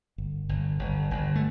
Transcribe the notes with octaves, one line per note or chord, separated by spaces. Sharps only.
G1
G1
G1
G1
A3